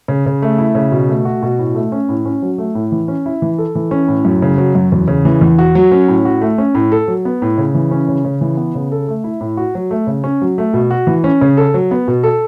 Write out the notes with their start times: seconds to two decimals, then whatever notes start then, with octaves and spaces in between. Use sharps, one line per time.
0.08 C#3
0.26 C#3
0.42 A3
0.58 E4
0.75 C#3
0.92 B2
1.09 A3
1.25 F#4
1.42 B2
1.59 A2
1.75 A3
1.92 C#4
2.09 A2
2.25 C#4
2.42 F#3
2.58 A3
2.75 A2
2.92 E3
3.08 C#4
3.26 E4
3.42 E3
3.58 A4
3.75 E3
3.91 C#4
4.08 A2
4.25 F#2
4.42 C#3
4.58 F#3
4.75 F#2
4.92 E2
5.08 C#3
5.25 E3
5.41 E2
5.58 F#4
5.75 F#3
5.92 C#4
6.08 A2
6.25 F#4
6.41 A3
6.58 C#4
6.75 A2
6.92 A4
7.08 F#3
7.25 B3
7.42 A2
7.58 C#3
7.75 E3
7.91 C#4
8.09 C#3
8.25 C#3
8.41 E3
8.57 B3
8.75 C#3
8.92 A4
9.08 A3
9.24 E4
9.41 A2
9.57 F#4
9.75 F#3
9.91 A3
10.07 C#3
10.24 C#4
10.42 F#3
10.58 A3
10.74 B2
10.91 F#4
11.07 E3
11.24 C#4
11.41 C#3
11.57 A4
11.74 F#3
11.91 B3
12.08 B2
12.23 A4